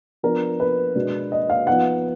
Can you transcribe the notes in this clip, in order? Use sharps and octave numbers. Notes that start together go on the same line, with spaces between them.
F3 B3 D4 A#4
B4
B2 G#3 D4
D#5
F5
F3 B3 D#4 F#5